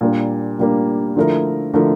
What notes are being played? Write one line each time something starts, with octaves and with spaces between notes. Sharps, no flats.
A#2 G3 A#3 D4
A#2 G3 A#3 D4
D3 F3 A3 E4 A#4
D3 F3 A3 E4 A#4